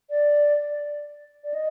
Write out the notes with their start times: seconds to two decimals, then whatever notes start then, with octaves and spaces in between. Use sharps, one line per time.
0.10 D5
1.44 D5
1.54 D#5